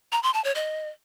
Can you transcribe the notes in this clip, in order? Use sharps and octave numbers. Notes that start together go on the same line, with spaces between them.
A#5
C6
A5
C#5
D#5